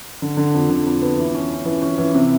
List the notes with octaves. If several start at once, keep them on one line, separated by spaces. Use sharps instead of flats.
D3
D3
F2
D3
F2
B3
E3
C#4
C#4
E3
C#4
E3
C3